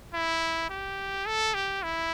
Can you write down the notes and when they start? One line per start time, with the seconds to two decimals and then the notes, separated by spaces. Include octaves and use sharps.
0.13 E4
0.69 G4
1.26 A4
1.54 G4
1.83 E4